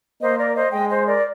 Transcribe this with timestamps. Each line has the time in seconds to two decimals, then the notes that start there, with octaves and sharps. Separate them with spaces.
0.21 A#3 C5 D#5
0.38 A#4 D5
0.54 C5 D#5
0.72 G#3 D#5 G5
0.89 C5 D#5
1.05 A#4 D5